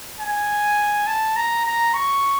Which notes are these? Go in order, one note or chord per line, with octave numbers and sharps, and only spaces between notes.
G#5
A5
A#5
A#5
C#6